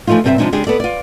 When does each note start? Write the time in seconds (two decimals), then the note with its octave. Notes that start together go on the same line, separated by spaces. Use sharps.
0.07 E3 F3 A3 D#4 F4
0.24 G2 C3 C4 G4 C5 E5
0.38 C3 F3 G#3 D4 D#4
0.52 C#3 G#3 D4 G4 G#4
0.67 B3 A4 D5
0.80 F4 D5